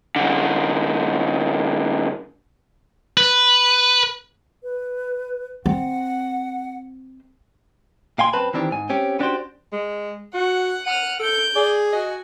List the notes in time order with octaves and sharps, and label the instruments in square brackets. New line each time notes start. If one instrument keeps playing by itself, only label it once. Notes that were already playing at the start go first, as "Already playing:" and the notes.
[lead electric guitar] F#2 D3
[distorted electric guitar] B4
[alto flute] B4
[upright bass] C4 [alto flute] F#5
[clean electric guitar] A#2 F5 G5 G#5 C6
F#2 C4 B4 A5 B5
D#3 E3 C4 D4 G4
G#2 G#5
C4 C#4 G4
B3 C#4 D4 F#4 G4 C5
[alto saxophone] G#3
[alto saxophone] F#4 [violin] F#5
[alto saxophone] F#5 [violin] F6 D#7
[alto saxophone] A4 [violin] G6 D7
[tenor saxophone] G#4 [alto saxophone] D5
[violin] F#4 G#5 [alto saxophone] D#5